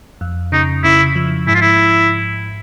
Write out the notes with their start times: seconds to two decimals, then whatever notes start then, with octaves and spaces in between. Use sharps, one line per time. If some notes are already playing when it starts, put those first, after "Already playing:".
0.21 F2
0.52 C#3 D#4
0.84 C#3 E4
1.16 F3
1.47 G#2 E4
1.55 F4
1.61 E4